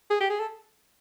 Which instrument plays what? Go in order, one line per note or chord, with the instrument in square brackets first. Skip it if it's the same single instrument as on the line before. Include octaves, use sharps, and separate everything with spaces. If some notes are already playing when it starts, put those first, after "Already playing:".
[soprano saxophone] G#4
G4
G#4
A4